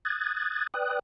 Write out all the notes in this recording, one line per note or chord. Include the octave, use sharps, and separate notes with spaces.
D#6 F#6 G#6 A6
B4 D5 G5 D#6 F#6